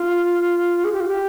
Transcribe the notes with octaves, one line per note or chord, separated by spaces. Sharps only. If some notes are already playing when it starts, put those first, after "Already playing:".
Already playing: F4
G#4
G4
F4
G4